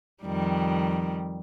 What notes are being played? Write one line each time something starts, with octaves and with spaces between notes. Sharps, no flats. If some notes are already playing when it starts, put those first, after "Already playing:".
F2 D#3 G3